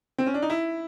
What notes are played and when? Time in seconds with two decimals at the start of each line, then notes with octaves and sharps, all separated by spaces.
0.18 C4
0.27 C#4
0.34 D4
0.42 D#4
0.50 E4